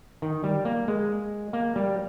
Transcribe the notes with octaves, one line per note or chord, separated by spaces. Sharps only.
D#3
G3
A#3
G#3
A#3
G3